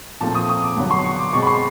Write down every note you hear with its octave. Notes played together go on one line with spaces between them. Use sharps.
A#2 F3 A3 C4 A5
D#6
D#6
D6
G2 D3 F#3 B3
C6
C#6
D6
B2 G#3 C4 C#6
B5
C6